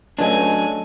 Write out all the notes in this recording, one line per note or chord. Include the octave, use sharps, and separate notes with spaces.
C#2 F#3 A3 C#4 D4 D#5 G#5